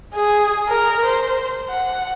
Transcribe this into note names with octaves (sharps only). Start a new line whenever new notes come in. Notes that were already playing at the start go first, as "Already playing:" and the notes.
G#4
A#4
C5
F#5